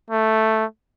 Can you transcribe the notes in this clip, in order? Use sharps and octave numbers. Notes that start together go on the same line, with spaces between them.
A3